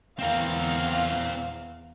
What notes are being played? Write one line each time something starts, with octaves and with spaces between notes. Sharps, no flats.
E2 C4 A#4 F5